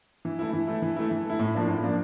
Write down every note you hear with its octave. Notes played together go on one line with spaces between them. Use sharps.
E3
A3 E4
E3
A3 E4
E3
A3 E4
E3
A3 E4
A2
F3 A#3 D4
A2
F3 A#3 D4